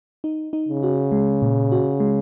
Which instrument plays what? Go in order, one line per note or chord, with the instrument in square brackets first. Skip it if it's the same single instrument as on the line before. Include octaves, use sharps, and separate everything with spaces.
[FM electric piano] D#4
D#4
[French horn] C#3
[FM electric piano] F#4
G#3
A#2
F#4
G#3